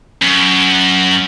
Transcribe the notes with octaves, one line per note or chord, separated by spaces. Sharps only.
F#2